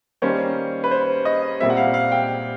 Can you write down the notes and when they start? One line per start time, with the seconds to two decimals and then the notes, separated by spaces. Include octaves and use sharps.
0.22 D#3 G3 A#3 C#4 C5
0.84 B4
0.91 C5
1.25 D#5
1.60 A#2 G3 C4 E5
1.70 F#5
1.77 F5
1.94 F5
2.12 G5